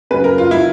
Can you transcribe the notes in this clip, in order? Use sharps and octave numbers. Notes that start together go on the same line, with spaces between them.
C#3 F#3 B4
A#4
F4
E4